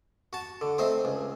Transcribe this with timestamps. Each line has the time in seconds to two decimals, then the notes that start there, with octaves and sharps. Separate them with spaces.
0.33 F#4 A5
0.61 D3
0.78 A3 C4 D#4 C5
1.05 C#2